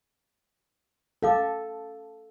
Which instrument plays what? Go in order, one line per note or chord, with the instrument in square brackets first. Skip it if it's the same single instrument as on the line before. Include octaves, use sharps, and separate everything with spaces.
[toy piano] C#4 F5 D6 [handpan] A4